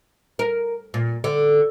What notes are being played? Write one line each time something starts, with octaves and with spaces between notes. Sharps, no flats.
A#4
A#2
D3